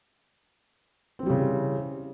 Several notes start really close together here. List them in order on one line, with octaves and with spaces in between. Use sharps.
C4 E3 G3 C#3